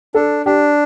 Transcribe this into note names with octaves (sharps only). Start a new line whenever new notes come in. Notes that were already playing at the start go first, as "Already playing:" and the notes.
D4 A4
D4 G4